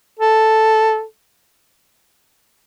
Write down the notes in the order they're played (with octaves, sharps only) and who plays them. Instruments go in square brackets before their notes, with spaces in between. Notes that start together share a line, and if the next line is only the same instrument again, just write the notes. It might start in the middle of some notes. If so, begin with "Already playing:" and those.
[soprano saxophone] A4